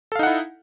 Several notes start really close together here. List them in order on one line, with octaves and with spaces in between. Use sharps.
A4 F5 D#4 F#5 E4